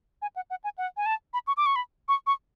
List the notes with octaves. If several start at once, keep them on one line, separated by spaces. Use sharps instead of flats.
G#5
F#5
F#5
G#5
F#5
G#5
A5
B5
C#6
D6
C#6
B5
C#6
C#6